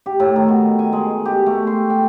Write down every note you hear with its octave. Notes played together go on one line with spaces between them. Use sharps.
G4
A2
D#3
B2
G#5
G#3
G4
A3
C6
G5